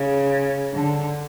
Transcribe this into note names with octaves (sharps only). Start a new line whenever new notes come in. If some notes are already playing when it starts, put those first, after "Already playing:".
Already playing: C#3
D3